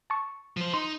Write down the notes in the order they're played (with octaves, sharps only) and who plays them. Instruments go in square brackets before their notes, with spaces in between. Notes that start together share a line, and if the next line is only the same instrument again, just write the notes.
[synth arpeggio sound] A5 C#6
[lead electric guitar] F3 C5
[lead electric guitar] D#4 [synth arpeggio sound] C6